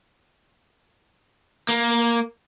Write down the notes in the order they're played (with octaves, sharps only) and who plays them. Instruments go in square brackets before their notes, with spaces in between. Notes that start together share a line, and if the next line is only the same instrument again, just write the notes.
[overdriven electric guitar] A#3